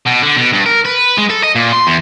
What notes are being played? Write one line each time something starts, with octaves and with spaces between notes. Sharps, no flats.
B2
D3
B2
G2
A#4
B4
G#3
A4
D#5
A#2
C6
E2